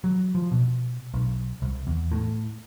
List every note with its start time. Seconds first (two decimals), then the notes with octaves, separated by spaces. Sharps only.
0.04 F#3
0.35 F3
0.52 B2
1.14 B1
1.62 C2
1.87 E2
2.12 A2